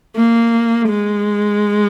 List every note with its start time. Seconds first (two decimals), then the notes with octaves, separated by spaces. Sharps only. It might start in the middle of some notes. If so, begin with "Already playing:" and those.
0.16 A#3
0.89 G#3